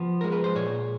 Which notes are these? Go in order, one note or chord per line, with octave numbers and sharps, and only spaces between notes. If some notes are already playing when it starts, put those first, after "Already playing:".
Already playing: F3 B3
G#3 A#4
B4
C5
A#2 C#5